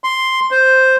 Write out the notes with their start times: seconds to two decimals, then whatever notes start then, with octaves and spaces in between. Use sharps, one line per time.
0.04 C6
0.51 C5